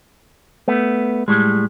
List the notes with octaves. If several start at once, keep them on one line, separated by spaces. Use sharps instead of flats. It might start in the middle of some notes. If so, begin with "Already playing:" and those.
A3 B3
A2 G3 G#3